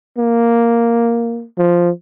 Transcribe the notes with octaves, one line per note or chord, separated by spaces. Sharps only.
A#3
F3